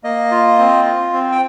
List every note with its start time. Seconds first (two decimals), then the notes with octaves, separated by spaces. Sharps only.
0.04 A#3 D#5
0.31 F4
0.59 C4
0.86 F4
1.13 C4
1.32 G5